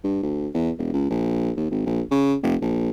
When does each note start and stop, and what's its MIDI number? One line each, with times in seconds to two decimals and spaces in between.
0.04 0.20 43
0.23 0.48 38
0.54 0.70 40
0.78 0.92 28
0.93 1.09 37
1.10 1.50 34
1.57 1.69 39
1.71 1.81 32
1.86 2.01 34
2.11 2.35 49
2.43 2.56 29
2.62 2.90 34